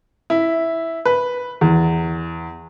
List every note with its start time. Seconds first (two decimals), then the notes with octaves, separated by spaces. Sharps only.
0.30 E4
1.05 B4
1.61 E2